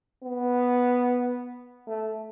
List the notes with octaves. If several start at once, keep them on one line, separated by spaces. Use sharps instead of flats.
B3
A3